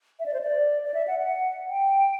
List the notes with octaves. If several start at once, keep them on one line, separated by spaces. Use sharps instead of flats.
E5
D5
C5
D5
D5
E5
F#5
F#5
G5